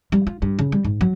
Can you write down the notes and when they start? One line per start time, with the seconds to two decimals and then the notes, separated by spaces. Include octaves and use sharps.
0.12 G3
0.27 F4
0.42 G2
0.59 C#3
0.72 G3
0.85 G#2
1.01 F#3